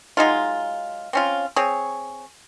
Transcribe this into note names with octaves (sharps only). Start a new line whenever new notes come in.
F#3 G#3 D#4 F4
C4 C#4 F4
C4 G#4 C#5